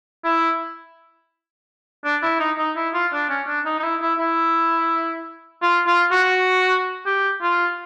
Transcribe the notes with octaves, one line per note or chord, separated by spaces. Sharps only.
E4
D4
E4
D#4
D#4
E4
F4
D4
C#4
D4
D#4
D#4
E4
E4
E4
F4
F4
F#4
G4
F4